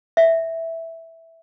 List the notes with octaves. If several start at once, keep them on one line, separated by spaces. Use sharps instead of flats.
E5